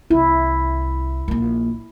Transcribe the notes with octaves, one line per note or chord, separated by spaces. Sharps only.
C2 E4
A#1 A#3